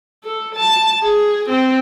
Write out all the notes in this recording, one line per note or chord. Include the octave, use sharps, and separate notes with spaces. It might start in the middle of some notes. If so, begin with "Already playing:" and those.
A4
A5
G#4
C4